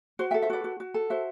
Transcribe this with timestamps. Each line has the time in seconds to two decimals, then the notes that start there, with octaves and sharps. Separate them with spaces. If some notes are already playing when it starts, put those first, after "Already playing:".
0.19 F#4 C5
0.31 E5 G5
0.34 A4
0.42 C5 E5
0.50 F#4 B4 D5
0.64 F#4
0.80 F#4
0.94 A4
1.10 F#4 C5 E5